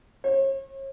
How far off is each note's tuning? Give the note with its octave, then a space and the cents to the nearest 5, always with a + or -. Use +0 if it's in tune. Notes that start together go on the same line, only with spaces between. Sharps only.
C#5 -40